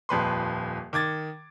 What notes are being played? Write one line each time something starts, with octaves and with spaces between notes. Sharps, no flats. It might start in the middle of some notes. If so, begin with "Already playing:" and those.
D#1 F2 B4 C6
D#3 D6 G#6 A6